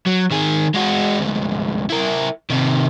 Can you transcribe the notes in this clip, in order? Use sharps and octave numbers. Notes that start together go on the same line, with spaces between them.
F#3
D#3 G#4
G#3 F#4
D2 G#2
E4 A#4
C3 D#3